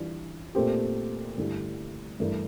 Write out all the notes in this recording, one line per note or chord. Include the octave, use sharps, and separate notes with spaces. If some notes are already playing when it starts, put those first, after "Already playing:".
Already playing: E3 G3 D4 F4
A#2 A3 C4 G4
G2 D3 A3 E4 G4
G2 E3 A3 E4 A#4